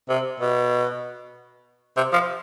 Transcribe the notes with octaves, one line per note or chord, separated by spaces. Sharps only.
C3
B2
C3
F3